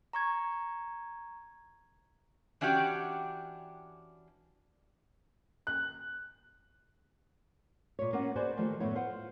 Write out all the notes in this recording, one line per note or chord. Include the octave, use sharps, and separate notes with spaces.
A#5 C#6 G#6
E3 C#4 D4 F#4 G4 G5
F#6
A#2 C#5
A#3 C#4 F4 F#4 F#5
F#4 G#4 B4 C5 D5 G#5
D#3 F3 A3 A#3 G4
F#2 A2 B3 E4 C#5
F4 C5 F5 F#5